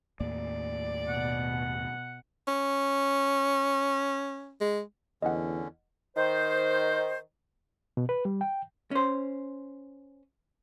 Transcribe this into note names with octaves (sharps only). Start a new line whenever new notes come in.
D#2 A2 A#3 D5
B2 F#5
C#4
G#3
E2 D3 C#4 D#5 F#5
D#3 C5
B2
B4
G3
G5
C#4 C5